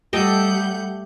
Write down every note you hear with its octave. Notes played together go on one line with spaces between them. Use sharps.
G3 A3 G4 A4 D#5 F#5 G5 G6